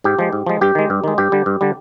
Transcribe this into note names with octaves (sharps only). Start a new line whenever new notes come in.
G#2 G4
F3 G#3
G#2
F3 G#3
G2 G4
D#3 G#3
G2
D#3 G#3
G2 G4
D3 G3
G2
D3 G3